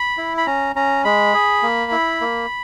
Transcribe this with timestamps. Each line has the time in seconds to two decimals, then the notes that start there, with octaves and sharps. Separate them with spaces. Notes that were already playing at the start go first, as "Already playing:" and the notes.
Already playing: B5
0.18 E4
0.37 B5
0.46 C#4 A#5
0.75 C#4 A#5
1.04 G#3 B5
1.34 G#4
1.63 A#3
1.92 E4
2.21 A#3